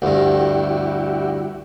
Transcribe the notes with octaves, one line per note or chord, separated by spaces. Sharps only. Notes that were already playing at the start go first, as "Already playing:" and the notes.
D2 G2 E4 F#4 G4